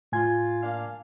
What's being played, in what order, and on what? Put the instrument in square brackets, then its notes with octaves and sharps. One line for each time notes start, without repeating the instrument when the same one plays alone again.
[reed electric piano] A2 G#5 G#6 [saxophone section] F4
[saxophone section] A#3 D4 F5